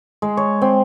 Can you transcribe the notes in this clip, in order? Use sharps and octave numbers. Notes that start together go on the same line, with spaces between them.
G#3
C#5
C4